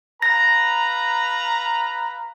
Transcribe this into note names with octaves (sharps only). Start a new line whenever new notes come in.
B4 F5 A#5 A#6